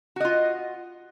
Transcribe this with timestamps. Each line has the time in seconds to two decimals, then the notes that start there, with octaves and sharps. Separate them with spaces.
0.16 F#4
0.20 D#5
0.25 F4